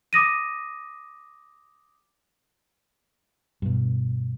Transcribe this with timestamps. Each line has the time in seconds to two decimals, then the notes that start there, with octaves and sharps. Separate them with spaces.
0.13 D6 D#6 A#6 D#7
3.62 G2 B2